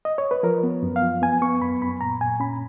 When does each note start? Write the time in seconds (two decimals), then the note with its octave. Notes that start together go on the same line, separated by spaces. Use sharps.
0.05 D#5
0.18 C#5
0.31 B4
0.43 F3 A#4
0.63 B3
0.83 F#2
0.96 F5
1.02 F3
1.22 B3 G#5
1.42 B3 C#6
1.62 F#2 B5
1.82 F#2 B5
2.01 A#2 A#5
2.21 A#2 G#5
2.40 C#4 B5